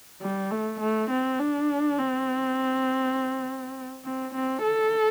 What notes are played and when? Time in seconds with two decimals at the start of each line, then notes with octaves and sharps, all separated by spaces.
0.22 G3
0.51 A3
0.80 A3
1.10 C4
1.39 D4
1.98 C4
4.04 C4
4.34 C4
4.63 A4